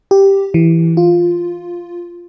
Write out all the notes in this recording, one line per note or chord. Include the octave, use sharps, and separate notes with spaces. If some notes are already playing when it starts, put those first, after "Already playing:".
G4
E3
F4